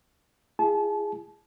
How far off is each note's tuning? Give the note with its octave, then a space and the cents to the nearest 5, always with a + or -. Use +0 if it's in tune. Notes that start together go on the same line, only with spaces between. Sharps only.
E4 +45 G#4 -10 A5 -30